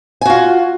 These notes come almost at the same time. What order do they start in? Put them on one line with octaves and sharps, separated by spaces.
G#5 F#4 F4